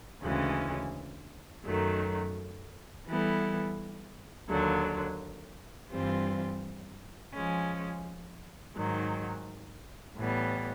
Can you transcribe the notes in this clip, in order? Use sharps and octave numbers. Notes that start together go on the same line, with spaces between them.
D2 C#3 E3 G#3 C#4
F#2 D#3 F#3 A3
E3 G3 B3 E4 A4
D#2 D3 F#3
G2 E3 G3 C4 F4
F3 G#3 C#4
G#2 D#3 F#3
A2 E3 G3 B3